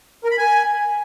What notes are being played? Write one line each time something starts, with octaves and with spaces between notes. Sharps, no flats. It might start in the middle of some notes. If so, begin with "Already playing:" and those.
A#4
B5
G#5